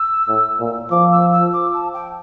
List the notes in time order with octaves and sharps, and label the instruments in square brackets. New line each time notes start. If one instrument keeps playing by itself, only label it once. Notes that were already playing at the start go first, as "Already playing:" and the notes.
Already playing: [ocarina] E6
[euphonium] A2
A#2
[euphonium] F3 [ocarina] D6
[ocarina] E6
E6
D6
A5
G5